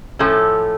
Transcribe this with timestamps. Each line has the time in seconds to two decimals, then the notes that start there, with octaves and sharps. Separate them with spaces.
0.19 A2 F3 A3 C#4 A4